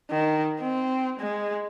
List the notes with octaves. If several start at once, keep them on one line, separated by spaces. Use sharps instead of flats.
D#3
C4
G#3